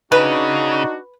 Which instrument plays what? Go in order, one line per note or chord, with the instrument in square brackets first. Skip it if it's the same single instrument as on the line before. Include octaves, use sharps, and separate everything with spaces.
[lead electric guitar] C#3 [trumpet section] D4 F#4 [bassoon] D#4 [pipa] B4